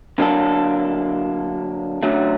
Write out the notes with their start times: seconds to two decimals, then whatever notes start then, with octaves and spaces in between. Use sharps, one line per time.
0.19 D3 F#3 A#3 D4 A4
2.03 F#2 D3 F#3 A3